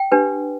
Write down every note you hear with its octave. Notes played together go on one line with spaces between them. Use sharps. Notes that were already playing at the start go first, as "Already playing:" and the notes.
Already playing: G5
D4 G4 B4